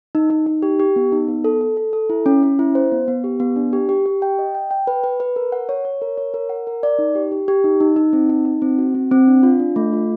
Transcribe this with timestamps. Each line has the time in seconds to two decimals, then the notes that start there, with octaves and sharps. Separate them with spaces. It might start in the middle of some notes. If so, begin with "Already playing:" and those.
0.15 D#4
0.30 D#4
0.47 D#4
0.62 G4
0.79 G4
0.96 B3
1.12 D#4
1.28 B3
1.44 A4
1.61 A4
1.77 A4
1.93 A4
2.10 E4
2.26 C#4
2.43 C#4
2.59 E4
2.75 C5
2.92 B3
3.08 B3
3.24 G4
3.40 B3
3.56 D4
3.73 G4
3.89 G4
4.06 G4
4.22 G5
4.39 D#5
4.55 G5
4.71 G5
4.87 B4
5.04 B4
5.20 B4
5.36 A#4
5.52 F#5
5.69 C#5
5.85 C#5
6.02 A#4
6.18 C#5
6.34 A#4
6.49 F#5
6.67 A#4
6.83 D5
6.99 D#4
7.15 G4
7.32 G4
7.48 G4
7.64 D#4
7.80 D#4
7.96 D#4
8.13 C4
8.30 D#4
8.45 D#4
8.62 C4
8.78 F#4
8.95 C4
9.11 C4
9.27 D4
9.43 F4
9.60 D4
9.76 A3
9.93 F4